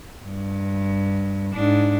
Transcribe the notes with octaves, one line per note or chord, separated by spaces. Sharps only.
G2
G#2 D4